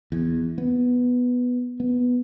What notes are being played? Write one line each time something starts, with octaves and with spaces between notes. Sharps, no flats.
E2
B3
B3